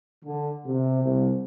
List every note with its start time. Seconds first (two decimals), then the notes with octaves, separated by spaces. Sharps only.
0.25 D3
0.65 C3
1.02 C2